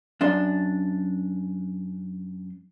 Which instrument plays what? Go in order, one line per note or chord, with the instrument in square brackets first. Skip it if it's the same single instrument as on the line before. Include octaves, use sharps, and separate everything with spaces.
[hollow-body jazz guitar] F#2 D4 C6